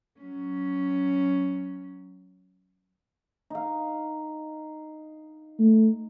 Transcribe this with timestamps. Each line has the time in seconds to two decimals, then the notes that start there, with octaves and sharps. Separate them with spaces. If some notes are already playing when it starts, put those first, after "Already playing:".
0.20 F#3 C#4
3.50 D#4 F5
5.59 A3